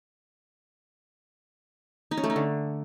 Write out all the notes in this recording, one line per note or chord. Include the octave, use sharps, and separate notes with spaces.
D#4
C#4
A3
D#4
D3